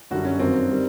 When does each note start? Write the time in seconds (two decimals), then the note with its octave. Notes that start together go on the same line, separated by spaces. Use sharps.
0.10 F#2 D3 G3 F#4
0.25 C#4
0.39 G2 D#3 F#3 C4
0.70 D#3 G3